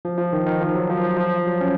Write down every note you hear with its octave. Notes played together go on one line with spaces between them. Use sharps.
F3
F3
D#3
D#3
F3
F#3
F3
F3
F3
F#3
C#4